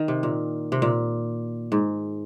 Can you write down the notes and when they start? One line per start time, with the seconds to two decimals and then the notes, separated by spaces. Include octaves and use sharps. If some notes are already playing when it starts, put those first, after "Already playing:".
Already playing: D#3
0.08 C3
0.23 A#2
0.72 C3
0.82 A#2
1.72 G#2